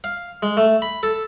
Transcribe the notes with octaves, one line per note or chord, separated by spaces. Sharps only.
F5
G#3
A3
B5
A4